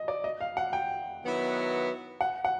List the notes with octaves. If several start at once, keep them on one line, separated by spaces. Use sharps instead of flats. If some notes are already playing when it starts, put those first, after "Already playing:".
Already playing: D#5
D5
D#5
F5
F#5
G5
D#3 F#3 B3 E4
F#5
F#5